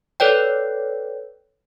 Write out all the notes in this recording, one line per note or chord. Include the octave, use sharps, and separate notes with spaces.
A4 B4 C#5 D5 G5